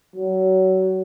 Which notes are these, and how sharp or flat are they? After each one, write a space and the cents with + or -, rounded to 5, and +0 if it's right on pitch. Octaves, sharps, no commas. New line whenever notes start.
F#3 +25